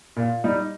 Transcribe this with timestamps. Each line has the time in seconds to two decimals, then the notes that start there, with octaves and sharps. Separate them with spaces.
0.16 A#2
0.44 G3 D#4